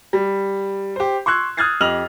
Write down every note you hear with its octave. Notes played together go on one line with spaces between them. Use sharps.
G3
G4 C5
C6 C#6 E6 F#6 G#6
D#6 F6 F#6 G#6 A6 C7
F2 G4 D#5 F6 F7 F#7